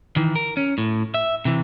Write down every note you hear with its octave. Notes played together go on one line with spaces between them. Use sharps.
D#3 E3
A#4
C#4
A2
E5
C3 E3